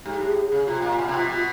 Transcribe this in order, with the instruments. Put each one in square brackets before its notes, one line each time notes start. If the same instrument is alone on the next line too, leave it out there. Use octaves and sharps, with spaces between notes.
[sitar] G#2 [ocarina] G4
[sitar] A2
[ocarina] G#4
G#4
[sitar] C#3
[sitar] C3 [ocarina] F4
[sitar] A#2
B2
C3
B2
B2